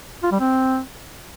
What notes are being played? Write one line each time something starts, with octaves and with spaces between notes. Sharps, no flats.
F4
G3
C4